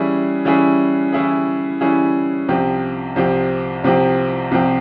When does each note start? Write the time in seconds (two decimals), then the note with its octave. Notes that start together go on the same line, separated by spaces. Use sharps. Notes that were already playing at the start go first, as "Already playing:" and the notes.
Already playing: E3 G3 C#4 E4 G#4
0.45 E3 G3 C#4 E4 G#4
1.12 E3 G3 C#4 E4 G#4
1.81 E3 G3 C#4 E4 G#4
2.48 C2 C3 F3 C4 G4
3.16 C2 C3 F3 C4 G4
3.84 C2 C3 F3 C4 G4
4.51 C2 C3 F3 C4 G4